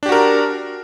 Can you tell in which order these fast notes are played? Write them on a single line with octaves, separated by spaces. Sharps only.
D4 G4 F#4 A#4